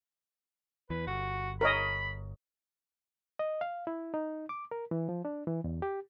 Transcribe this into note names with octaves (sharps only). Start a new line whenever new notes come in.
E2 E3 B4
G1 F#4
A#4 C#5 D#5 B5
D#5
F5
E4
D#4
D6
A#4
E3
F3
D4
E3
E2
G4